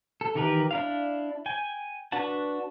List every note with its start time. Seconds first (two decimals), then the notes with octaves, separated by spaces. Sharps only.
0.21 A4
0.35 D#3 E3 G4 A#4 B4
0.71 D4 E4 F5
1.46 G5 G#5
2.12 D4 F#4 B4 F#5 A5